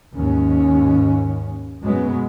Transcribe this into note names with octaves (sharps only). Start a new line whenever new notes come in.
D#2 G#2 C#4
F#2 B2 F#3 G#3 B3